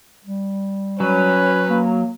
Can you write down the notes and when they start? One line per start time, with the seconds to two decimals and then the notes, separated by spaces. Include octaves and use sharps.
0.24 G3
1.00 F#3 C#4 B4
1.70 A#3